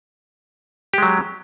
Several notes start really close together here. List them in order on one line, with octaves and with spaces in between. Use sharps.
G4 G#3 F#3